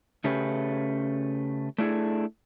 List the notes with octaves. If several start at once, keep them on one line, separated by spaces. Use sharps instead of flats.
C#3 A3 C#4 G4 G#4 B4
A3 D4 E4 G#4 A4